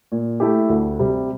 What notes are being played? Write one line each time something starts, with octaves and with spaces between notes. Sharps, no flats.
A#2
A3 E4 G4
D2
C3 G3